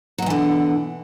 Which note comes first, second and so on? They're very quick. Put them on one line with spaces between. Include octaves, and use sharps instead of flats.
F#3 B2 E3 D3